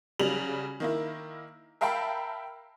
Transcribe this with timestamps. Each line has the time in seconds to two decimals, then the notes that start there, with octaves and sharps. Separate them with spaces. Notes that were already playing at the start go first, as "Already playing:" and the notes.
0.19 C#3 F#3 G3 F7 F#7
0.80 D#3 A#3 E4
1.81 A#4 E5 F5 G5 A5 B5